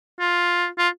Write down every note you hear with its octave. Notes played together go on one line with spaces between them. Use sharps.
F4
F4